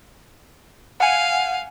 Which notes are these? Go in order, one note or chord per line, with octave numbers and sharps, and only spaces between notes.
F5 F#5 G#5